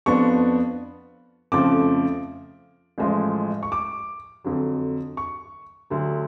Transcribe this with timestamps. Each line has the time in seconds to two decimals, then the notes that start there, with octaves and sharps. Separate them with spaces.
0.06 F2 F3 B3 D4 C#6
1.52 F2 C#3 F3 A3 D6
2.98 A1 A2 F3 G#3
3.63 C#6
3.72 D6
4.44 F2 D3 F#3
5.17 C#6
5.90 D2 D3 F#3